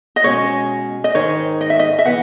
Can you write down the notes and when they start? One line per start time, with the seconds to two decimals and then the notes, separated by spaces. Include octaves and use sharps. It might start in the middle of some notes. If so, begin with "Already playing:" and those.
0.16 D#5
0.24 B2 G#3 C#4 C#5
1.04 D#5
1.15 G#2 D#3 G#3 D#4 C#5
1.61 D#5
1.70 E5
1.79 D#5
1.99 E5
2.06 E3 B3 F#5